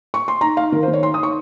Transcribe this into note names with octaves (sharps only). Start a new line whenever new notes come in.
C#6
C6
D#4 A#5
D#4 F5
D#3 A#4
C5
D#3
C#5
D#4 C6
D#6
D#4 C#6